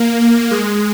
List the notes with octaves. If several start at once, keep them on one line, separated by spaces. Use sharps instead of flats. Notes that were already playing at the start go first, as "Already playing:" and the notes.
Already playing: A#3
A#3
G#3